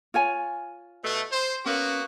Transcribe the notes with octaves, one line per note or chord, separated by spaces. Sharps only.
F4 C#5 G#5
B2 A3
C5
A#3 B3 C#4 F#4